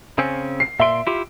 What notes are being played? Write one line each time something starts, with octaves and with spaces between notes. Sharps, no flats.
C#3 C4 C#4
C7
A#2 E5 C6 D7
E4 F4 G4